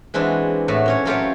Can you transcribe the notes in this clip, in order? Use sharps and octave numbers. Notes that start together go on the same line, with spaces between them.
E3 G#3 C4 D4 E4 F#4
A2 A3 F#4
A#2 C#4 C#5
F#3 A3 F4 G4 A#4 C#5